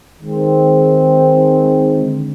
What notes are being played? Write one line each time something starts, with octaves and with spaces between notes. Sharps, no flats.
D#3 G#3 C4
D3